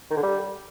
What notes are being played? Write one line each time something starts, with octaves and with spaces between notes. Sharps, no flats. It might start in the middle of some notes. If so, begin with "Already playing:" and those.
D#3
D3
G3